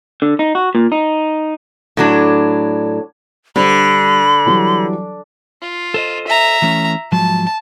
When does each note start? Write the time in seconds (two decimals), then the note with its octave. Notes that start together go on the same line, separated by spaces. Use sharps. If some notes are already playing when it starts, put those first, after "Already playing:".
0.22 D3
0.39 D#4
0.55 F#4
0.75 A#2
0.92 D#4
1.97 A2 F#3 D4
3.56 D3 G3 C5 D5 B5
4.46 E3 F#3 G3
5.62 F4
5.94 A4 C5 D#5
6.27 E5 A#5
6.62 E3 A3 C#4
7.12 G#2 F3 F#3 A5